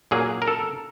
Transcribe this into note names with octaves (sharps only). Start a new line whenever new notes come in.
A#2 F#3 A#3 G#4
A#4
A4